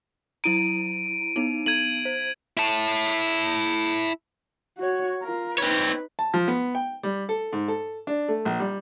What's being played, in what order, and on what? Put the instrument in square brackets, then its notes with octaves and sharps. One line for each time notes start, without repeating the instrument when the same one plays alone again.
[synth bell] F#3 E4 A#5 [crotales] D7 D#7
[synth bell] B3 D#4
[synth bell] B3 D7 [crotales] G#6 D#7 F#7
[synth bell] C5
[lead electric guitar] E4 A5
[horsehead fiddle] F#4 C#5
F4 A#4
[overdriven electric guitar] C4 C#5 [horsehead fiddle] D#4 B4
[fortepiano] A5
F3
B3
G5
G3
A4
G#2
A4
D4
A3
A#1
G3